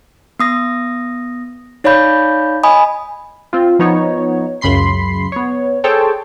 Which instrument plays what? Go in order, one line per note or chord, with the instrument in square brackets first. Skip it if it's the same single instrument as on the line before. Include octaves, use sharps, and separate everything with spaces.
[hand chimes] B3 D#6 A#6
D#4 C#5 D5 F5 B5 G6
D#5 G#5 B5 D#6
[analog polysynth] C4 F4
F3 B3 D#4 C#5
C#2 F#2 C#3 B5 C6 C7
B3 C#5
G#4 A4 C5 C#5 G5 A5